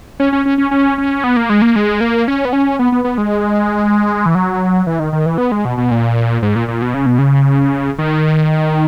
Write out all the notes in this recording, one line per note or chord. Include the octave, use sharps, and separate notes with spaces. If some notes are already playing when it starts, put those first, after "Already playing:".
C#4
C#4
C#4
C#4
C#4
C#4
B3
A#3
G#3
A#3
G#3
A#3
C#4
B3
C#4
B3
B3
B3
G#3
E3
F#3
E3
D#3
D#3
E3
B3
G#3
B2
B2
A#2
G#2
A#2
A#2
B2
C#3
B2
C#3
D#3